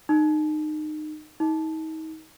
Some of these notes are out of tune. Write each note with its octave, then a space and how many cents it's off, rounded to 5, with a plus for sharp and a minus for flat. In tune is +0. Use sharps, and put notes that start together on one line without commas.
D#4 -25
D#4 +35